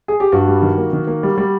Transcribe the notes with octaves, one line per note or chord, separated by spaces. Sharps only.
G#4
G4
G2 F#4
G3
D#3
A#3
D#3
A#3
G3
G3